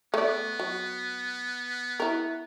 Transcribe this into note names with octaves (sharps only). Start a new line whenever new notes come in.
A3 B3 D5
F#3
E4 A#4